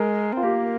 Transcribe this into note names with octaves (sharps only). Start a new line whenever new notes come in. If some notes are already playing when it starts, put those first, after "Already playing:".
Already playing: G#3 A#4
C4 F4
A#3 G4